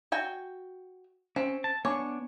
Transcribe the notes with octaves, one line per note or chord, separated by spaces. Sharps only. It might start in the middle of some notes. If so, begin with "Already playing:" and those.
F#4 G5 G#5
C4 C#4
A5
B3 D4 C#5 G#5 C#6 D6